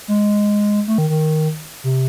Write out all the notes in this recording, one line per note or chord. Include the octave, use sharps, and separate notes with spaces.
G#3
A3
D#3
D#3
C3